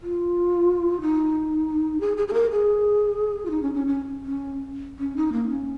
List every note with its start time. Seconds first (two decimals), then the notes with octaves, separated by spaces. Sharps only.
0.02 F4
1.01 D#4
2.00 G#4
2.17 G#4
2.28 G#4
2.33 A#4
2.51 G#4
3.45 F4
3.50 D#4
3.62 C#4
3.74 C#4
3.87 C#4
4.24 C#4
4.99 C#4
5.16 D#4
5.32 A#3
5.49 C#4